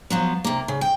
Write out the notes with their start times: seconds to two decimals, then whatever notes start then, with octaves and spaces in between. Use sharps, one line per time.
0.10 F3 F#3 B3
0.44 C3 A#3
0.68 C#3
0.81 G5